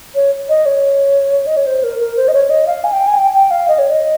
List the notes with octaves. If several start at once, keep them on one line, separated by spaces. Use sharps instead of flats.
C#5
D#5
C#5
D#5
C#5
C5
A#4
A#4
C5
D#5
C#5
D#5
F5
G#5
G5
G#5
G5
G5
F5
D#5
C#5
D#5